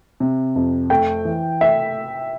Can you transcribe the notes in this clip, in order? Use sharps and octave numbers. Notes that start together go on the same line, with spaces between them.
C3
F2
A3 G5
E3
A3 E5